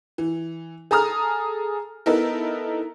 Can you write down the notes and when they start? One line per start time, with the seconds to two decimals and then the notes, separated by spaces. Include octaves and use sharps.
0.18 E3
0.91 G#4 A4 A#5 D#6 F6
2.06 B3 D#4 E4 A4 A#4